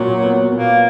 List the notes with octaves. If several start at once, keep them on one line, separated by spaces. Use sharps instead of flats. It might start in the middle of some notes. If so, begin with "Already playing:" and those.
Already playing: A#2 F#3
B3
A#2 A#3